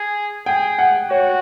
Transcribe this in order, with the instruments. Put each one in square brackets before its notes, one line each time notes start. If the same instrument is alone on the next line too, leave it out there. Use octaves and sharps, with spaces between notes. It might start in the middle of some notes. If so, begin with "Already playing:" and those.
Already playing: [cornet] G#4
[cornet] G#4 [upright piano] G5
[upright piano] F#5
[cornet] F#4 [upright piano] C#5